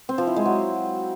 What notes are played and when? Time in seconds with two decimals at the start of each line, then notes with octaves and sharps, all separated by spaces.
0.09 C4
0.18 F3
0.27 E4
0.36 G#3
0.45 F#3